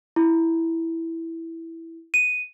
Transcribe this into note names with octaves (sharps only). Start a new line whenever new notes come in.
E4
D#7